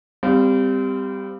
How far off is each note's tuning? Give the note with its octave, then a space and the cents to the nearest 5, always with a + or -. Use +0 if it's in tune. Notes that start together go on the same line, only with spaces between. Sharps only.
G3 +10 C4 -25 F5 +0